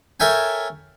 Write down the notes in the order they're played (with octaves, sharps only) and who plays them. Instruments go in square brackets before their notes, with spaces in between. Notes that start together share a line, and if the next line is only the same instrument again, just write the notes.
[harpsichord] A4 A#4 C#5 E5 G5 G#5